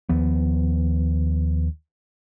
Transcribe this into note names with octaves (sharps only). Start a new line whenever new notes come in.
D#2 F3 B3